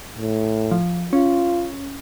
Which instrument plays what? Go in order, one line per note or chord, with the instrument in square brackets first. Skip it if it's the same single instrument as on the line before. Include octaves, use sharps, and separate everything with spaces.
[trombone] A2
[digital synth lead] F3
[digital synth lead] C#4 [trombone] F4